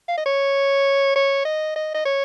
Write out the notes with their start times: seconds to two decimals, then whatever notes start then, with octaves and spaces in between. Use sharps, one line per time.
0.09 F5
0.18 D#5
0.26 C#5
1.16 C#5
1.45 D#5
1.76 D#5
1.94 D#5
2.06 C#5